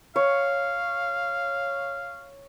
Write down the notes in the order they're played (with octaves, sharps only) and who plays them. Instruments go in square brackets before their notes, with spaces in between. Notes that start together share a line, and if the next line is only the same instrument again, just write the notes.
[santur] C#5 [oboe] F5